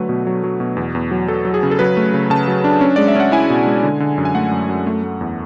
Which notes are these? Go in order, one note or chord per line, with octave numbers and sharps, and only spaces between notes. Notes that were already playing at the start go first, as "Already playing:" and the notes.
Already playing: D3 F#3 A3 B4
B2
F#3
F#3
B2
E2
E2
F#3
F#3 A4
F#3
G#4
C#3
A4
F#3 B4
A3
C#3
C#3 A5
F#3
D4
C#4
G#3 D5
E5
C#4 F#5
E4 G#5
B2
G#3
D3
D3
F#2
G#5
A3 F#5
F#2
F#2
A3
A3
E2